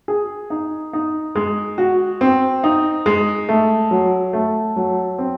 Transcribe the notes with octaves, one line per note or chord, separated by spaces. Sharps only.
G#4
D#4
D#4
G#3
F#4
C4
D#4
G#3
A3
F#3
A3
F#3
C4